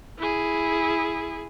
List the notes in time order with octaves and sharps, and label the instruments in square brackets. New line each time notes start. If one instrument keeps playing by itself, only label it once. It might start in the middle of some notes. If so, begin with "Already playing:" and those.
[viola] E4 G#4